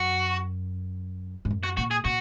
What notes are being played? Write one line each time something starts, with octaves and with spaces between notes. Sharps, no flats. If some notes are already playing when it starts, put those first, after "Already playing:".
Already playing: F#2 F#4
G#2
F#2
F#4
A#2 F#4
G#4
A#2 F#4